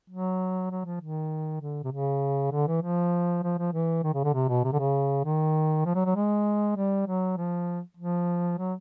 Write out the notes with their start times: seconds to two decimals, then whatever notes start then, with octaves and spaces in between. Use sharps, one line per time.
0.10 F#3
0.71 F#3
0.85 F3
1.01 D#3
1.61 D3
1.84 C3
1.92 C#3
2.52 D3
2.67 E3
2.82 F3
3.43 F3
3.58 F3
3.73 E3
4.03 D#3
4.14 C#3
4.24 D3
4.34 C3
4.49 B2
4.64 C3
4.73 D3
4.80 C#3
5.25 D#3
5.85 F3
5.95 F#3
6.06 F#3
6.16 G#3
6.76 G3
7.07 F#3
7.37 F3
7.97 F3
8.58 F#3